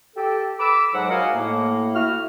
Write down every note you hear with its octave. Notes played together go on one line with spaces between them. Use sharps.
G4 A4 G5
B5 D6 E6
G#2 F#3 F#5
F#4 A#4 D#5 F5 F#5 G#5
A2 A#3
E4 F#4 F6